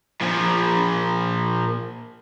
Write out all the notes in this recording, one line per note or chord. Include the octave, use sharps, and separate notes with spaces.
A#2 F3